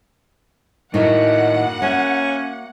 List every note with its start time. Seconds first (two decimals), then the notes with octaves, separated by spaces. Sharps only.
0.94 A2 D#3 A#3 D#4 E4 F#4 F#5
1.82 C#4 E5